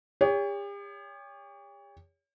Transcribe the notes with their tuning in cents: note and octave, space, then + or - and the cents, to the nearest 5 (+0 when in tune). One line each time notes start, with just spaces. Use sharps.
G4 +45 C#5 +30